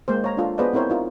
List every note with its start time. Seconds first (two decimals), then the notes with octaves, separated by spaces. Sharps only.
0.08 G#3 A#3 C5
0.24 C#5 F5 A#5
0.37 D4 F4 A4
0.58 B3 G#4 B4 C5 D5 D#5
0.73 C4 E4 A#4 C5 C#5
0.90 D#4 F4 A#4